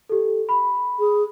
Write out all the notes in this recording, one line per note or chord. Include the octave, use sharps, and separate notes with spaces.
G4 A4
B5
G#4